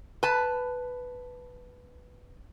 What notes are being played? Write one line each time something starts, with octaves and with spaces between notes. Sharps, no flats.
B4 A5